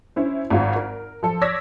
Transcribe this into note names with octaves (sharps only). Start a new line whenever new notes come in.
C#4 E4 C5
G#1 G#2 C4 F4
A#4
F3 A4
C#5 D5 E6 G#6 A#6 B6